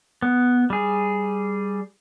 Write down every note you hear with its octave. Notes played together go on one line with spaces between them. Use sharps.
B3
G3 G#4